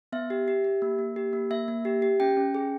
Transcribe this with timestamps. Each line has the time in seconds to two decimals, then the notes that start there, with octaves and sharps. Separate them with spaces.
0.12 B3 E5
0.30 G4
0.48 G4
0.64 G4
0.82 A#3
0.99 A#3
1.16 G4
1.33 A#3
1.51 A#3 E5
1.68 A#3
1.85 G4
2.02 G4
2.20 C#4 G5
2.37 C#4
2.55 G#4